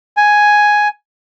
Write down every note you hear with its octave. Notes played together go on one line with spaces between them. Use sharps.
G#5